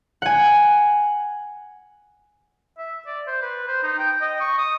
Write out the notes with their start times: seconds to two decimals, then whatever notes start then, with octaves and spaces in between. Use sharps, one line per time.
0.22 F#5 G#5
2.78 E5
3.07 D5
3.27 C5
3.42 B4
3.67 C5
3.83 D#4
3.98 G5
4.21 D#5
4.40 C#6
4.58 D#6